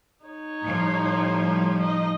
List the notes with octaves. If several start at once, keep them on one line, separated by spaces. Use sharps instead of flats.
D#4 C#5
A2 F3 G3
D#4 D#5